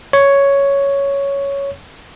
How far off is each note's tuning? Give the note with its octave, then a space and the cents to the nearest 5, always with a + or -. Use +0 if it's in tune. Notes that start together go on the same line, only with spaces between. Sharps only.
C#5 +5